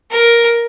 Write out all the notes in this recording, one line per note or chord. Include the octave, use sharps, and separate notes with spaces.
A#4